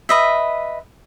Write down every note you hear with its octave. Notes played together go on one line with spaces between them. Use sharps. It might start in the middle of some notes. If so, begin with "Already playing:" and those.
B4 D#5 E5